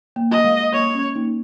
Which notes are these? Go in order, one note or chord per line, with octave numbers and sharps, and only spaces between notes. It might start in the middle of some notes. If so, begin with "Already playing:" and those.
A#3
D#5
G#3
A#3 C#5
C#4
A#3 D#4